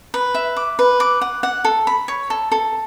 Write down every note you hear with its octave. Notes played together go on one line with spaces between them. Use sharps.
B4
E5
D6
B4
D6
F#5
F#5
A4
B5
C#5
A4
A4